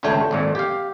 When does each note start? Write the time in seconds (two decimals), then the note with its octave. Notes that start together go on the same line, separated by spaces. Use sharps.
0.03 G#1 C#2 D3 A3 C#5 G5
0.31 G#1 F2 A#2
0.55 G4 F5